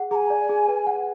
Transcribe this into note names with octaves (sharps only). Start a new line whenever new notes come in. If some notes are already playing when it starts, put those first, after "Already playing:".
Already playing: G#4 F#5
G#4 G#5 A#5
D5
G#4
B4
F#5